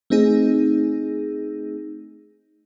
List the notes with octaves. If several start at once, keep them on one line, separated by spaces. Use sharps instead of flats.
A3 C4 D#4 G#4